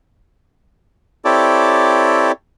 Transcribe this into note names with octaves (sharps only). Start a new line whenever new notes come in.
C4 E4 G4 A4 C#5 D5